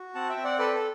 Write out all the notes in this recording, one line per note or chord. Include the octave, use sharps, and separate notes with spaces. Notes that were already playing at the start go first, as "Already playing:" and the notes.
Already playing: F#4
C4 F#5 A5
E5 G5
C4
D5 F#5
A4 B4 D5
A4